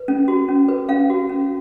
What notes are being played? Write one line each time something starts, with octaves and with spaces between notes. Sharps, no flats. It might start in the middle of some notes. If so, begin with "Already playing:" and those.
Already playing: B4
C#4
F#4
C#4
B4
C#4 F5
F#4
C#4